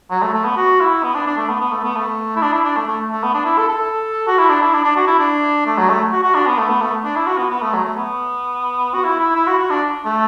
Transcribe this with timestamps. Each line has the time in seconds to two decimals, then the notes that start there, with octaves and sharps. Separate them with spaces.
0.11 F#3
0.22 A3
0.34 A3
0.45 B3
0.57 F#4
0.80 E4
1.03 B3
1.15 D4
1.26 D4
1.37 A3
1.49 B3
1.60 B3
1.72 A3
1.84 B3
1.96 A3
2.36 E4
2.42 D4
2.53 E4
2.64 D4
2.76 A3
2.87 A3
3.11 A3
3.23 B3
3.34 D4
3.45 E4
3.58 A4
3.68 A4
4.27 F#4
4.38 E4
4.49 D4
4.61 E4
4.73 D4
4.84 D4
4.96 F#4
5.07 E4
5.19 D4
5.66 A3
5.77 F#3
5.89 A3
6.12 F#4
6.23 F#4
6.34 D4
6.47 B3
6.58 A3
6.70 B3
6.82 A3
7.04 D4
7.16 E4
7.27 F#4
7.38 B3
7.50 B3
7.62 A3
7.73 F#3
7.85 A3
7.97 B3
8.94 F#4
9.04 E4
9.19 E4
9.35 E4
9.47 F#4
9.59 F#4
9.70 D4
10.05 A3